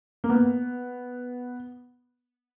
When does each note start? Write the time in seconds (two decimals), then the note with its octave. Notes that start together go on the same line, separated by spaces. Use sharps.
0.24 A#3
0.30 B3